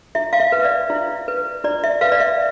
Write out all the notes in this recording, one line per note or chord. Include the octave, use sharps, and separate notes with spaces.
E4 E5
F5
E5
B4
D5
E4
B4
E4 D5
E5
B4 F5
D5
E5